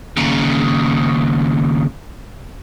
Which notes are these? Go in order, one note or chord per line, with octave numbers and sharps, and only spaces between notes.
D#2 C#3